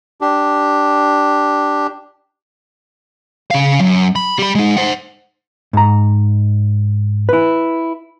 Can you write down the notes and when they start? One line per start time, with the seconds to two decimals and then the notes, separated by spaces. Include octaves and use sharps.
0.21 D4 G4
3.51 C#3 F5
3.80 F#2
4.16 B5
4.39 G3 B5
4.55 G#3 D#4
4.77 C5 F#5
5.73 G#2 A#5
7.29 E4 B4